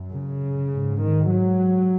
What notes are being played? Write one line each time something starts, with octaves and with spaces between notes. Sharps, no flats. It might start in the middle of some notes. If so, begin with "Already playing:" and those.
Already playing: F#2
C#3
G#2
D#3
F#3